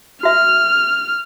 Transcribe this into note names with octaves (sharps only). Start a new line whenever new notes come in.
F#4 E5 F6